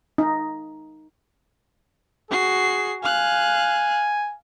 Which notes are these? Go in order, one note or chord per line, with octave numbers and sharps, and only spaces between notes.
D#4
F#4 G#4 C7
F5 G#5 F#6